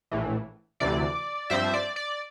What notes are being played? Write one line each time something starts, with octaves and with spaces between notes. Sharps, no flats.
A#1 A2 E3
D2 C3 E3 D5
G2 F3 C4 C5 E5
D5
D5